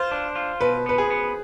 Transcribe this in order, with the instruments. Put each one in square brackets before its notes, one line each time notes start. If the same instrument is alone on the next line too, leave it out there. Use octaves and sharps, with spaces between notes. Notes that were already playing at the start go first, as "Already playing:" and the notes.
Already playing: [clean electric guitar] F4 [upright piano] C5
[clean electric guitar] D4
F4
[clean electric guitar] B2 [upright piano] B4
[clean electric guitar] B3 [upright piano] B4
[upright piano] G#4
[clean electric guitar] B3